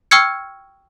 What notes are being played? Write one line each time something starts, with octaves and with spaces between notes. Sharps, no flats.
G5 C#6 E6 F6 G#6 C#7